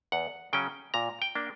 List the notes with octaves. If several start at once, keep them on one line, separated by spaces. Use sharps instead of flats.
E2 F#5
C#3 F#3 C#4 G5
A#2 A#5
G5
A#3 D4